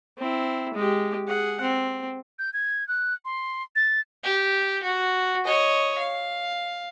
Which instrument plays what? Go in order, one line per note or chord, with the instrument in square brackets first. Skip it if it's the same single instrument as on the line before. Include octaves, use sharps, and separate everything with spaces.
[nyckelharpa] C4 E4
G#3 G4
G#4 F#5
C4
[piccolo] G6
G#6
F#6
C6
A6
[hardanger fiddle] G4
F#4
C#5 D#5
F5